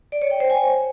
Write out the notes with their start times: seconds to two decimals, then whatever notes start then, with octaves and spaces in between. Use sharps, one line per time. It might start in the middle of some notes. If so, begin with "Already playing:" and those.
0.12 D5
0.22 C#5
0.31 G5
0.40 C5
0.50 G#5